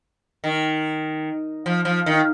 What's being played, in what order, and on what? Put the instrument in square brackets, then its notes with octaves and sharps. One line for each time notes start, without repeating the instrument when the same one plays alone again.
[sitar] D#3
F3
F3
D#3